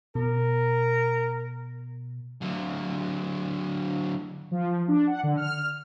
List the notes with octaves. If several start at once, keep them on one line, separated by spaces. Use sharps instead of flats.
B2 A#4
D3 F#3
F3
D4
F#5
D3
F6